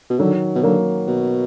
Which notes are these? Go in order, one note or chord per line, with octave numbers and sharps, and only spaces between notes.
B2
D3 D#3 F#3
B2
D3 F#3 A#3
B2